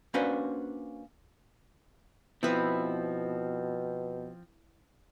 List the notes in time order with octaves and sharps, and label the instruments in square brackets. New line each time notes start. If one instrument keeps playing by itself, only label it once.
[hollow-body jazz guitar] A#3 C#4 D4 F#4 B4 C5
[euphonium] B2 [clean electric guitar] F3 C4 [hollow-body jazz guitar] B3 [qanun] E4 B4